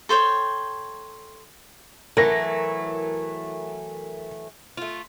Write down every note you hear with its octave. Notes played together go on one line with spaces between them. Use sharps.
A4 C5 C#5 G5
E3 F#3 A3 A#4 A#6
A3 F4